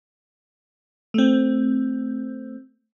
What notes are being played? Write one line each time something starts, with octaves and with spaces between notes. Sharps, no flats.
A3 C4